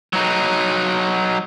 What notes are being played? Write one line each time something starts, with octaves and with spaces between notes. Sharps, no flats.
F#3 D#4